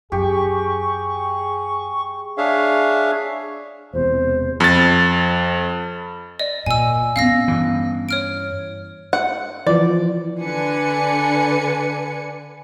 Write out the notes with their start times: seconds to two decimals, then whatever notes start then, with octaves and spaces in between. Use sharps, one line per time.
0.12 F#2 G4 G#4 C#6
2.38 D4 G#4 C#5 E5 F5
3.93 E1 E2 C3 C5
4.60 F2 A6
6.39 D5 D#5
6.66 A#2 G#5 E6
7.16 B3 C#4 F5 E6 A#6
7.48 G2 E3
8.09 C#5 F6 D7
9.13 F#5
9.67 E3 F3 D5
10.41 D3 D4 B4 G#5 C#7